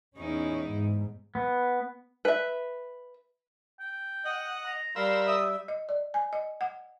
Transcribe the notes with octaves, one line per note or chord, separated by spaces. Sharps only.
E2 C#4 D#4 E4
G#2
B3
B4 E5
G5
D#5 F#5
A#5
G3 A#4 F5 B5 C6 E6
E5 D#6
D#5
D5
G#5
D#5
F#5